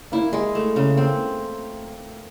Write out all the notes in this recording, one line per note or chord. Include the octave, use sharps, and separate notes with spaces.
A#3 E4
G#3
A3
C#3
A#3 C4